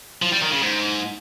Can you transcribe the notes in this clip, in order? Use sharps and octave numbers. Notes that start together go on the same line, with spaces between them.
F3
G3
D#3
C#3
G#2